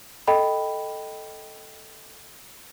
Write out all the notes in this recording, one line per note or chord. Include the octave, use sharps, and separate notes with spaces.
A4 D#5 G5 B5